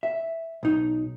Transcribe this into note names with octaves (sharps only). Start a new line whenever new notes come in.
E5
B1 D#4